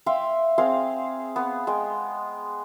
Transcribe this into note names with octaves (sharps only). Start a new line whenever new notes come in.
E5 F5 G5 C6
C4 G#4 C5 F5
B3
G#3 G5